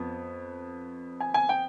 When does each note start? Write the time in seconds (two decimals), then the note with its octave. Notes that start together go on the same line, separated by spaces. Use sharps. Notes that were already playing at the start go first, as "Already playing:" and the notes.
Already playing: F2 B3
1.20 G#5
1.34 G#5
1.49 G5